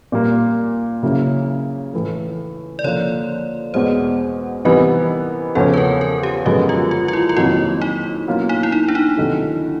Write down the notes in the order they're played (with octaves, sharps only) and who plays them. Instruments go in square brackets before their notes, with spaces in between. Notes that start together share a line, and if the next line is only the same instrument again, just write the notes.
[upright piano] A#2 G3 A#3
C#3 F#3 A#3 C#4 E4
A2 E3 A3
[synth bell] D5
[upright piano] D3 F3 A#3 [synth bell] C#5
[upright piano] E2 B2 G#3 [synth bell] C5
[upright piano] C3 E3 G3 B3 D#4 [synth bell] A#4
[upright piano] E2 C#3 F3 A3 C#4 [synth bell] A4
[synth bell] B4
A#4
A#4
G4
[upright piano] F#2 D3 F3 G#3 B3 [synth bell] F#4
[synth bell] F4
F4
F4
E4
F4
[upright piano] F2 C3 D#3 F#3 A#3 [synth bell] E4
[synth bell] D#4
[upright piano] B2 F#3 A#3 C#4 F4
[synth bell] D#4
E4
D#4
D4
D#4
[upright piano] D2 C3 D#3 F#3 A3